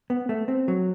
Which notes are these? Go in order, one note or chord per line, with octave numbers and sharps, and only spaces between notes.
B3
A3
C4
F#3